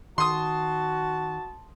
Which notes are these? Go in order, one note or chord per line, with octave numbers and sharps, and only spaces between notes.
D#3 F#4 A5 C6 D#6